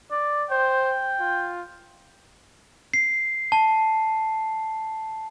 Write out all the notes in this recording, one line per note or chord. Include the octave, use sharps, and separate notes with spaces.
D5
C5 G5
F4
C7
A5